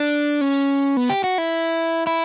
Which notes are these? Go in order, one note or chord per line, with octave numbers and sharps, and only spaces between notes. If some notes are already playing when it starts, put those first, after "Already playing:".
Already playing: D4
C#4
B3
G4
F#4
E4
E4